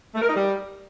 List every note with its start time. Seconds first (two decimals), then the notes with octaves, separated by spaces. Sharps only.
0.15 A3
0.22 A#4
0.29 D#4
0.35 G3